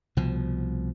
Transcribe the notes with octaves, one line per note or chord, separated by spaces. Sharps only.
C2 B2 F3